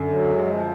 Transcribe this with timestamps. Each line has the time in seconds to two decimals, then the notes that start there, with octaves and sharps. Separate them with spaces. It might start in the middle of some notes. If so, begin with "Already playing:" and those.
Already playing: F#2 D3
0.11 F#3
0.28 G#3
0.47 F3